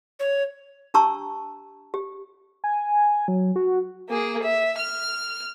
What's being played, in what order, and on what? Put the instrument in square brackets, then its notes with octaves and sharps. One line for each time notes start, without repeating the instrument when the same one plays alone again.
[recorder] C#5
[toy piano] D4 G4 A5 A#5 C#6 E6
G4
[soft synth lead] G#5
F#3
F#4
[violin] A#3 G#4
E5
F6